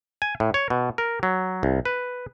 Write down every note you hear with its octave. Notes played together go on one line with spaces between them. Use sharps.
G#5
A2
C#5
B2
A#4
F#3
C2
B4